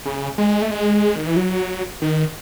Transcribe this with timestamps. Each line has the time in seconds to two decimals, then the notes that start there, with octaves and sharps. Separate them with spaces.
0.06 C#3
0.38 G#3
0.62 A3
0.71 G#3
1.16 D#3
1.27 E3
1.37 F#3
2.02 D#3